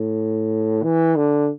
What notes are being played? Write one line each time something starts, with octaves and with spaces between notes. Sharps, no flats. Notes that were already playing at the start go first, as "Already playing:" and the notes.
Already playing: A2
E3
D3